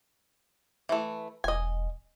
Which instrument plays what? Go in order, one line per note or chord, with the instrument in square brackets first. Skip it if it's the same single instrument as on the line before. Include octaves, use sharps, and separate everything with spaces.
[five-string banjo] E3 A3
[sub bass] E1 [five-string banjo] D#5 G#5